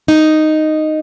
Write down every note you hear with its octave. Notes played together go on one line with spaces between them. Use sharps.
D#4